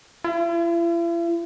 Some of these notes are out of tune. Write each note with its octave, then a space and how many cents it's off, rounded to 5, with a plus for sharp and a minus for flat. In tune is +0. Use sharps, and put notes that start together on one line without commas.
E4 +45